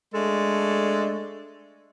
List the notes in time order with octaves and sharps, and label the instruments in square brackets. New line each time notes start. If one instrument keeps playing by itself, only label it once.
[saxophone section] G#3 A3 D4 A4